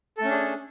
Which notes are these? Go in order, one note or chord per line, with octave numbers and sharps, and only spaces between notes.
A3 C#4 D4 G#4 A4